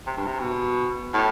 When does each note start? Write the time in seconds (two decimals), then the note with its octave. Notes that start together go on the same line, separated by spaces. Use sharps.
0.07 C3
0.17 G2
0.27 C3
0.40 B2
1.14 A2